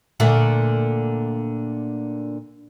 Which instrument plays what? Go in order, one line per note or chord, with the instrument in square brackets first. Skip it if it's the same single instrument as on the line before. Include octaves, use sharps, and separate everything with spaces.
[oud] A#2 D3 A3